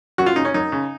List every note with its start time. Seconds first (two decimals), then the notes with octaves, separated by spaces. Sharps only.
0.18 F#2 F#4
0.26 F4
0.36 C#3 D#4
0.45 C#4
0.54 F#2 D#4
0.72 C#3